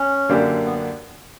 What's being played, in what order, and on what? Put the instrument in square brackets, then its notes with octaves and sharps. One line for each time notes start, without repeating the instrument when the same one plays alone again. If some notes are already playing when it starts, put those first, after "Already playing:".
Already playing: [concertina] C#4
[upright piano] F#2 D3 A#3 D4 G4
[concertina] B3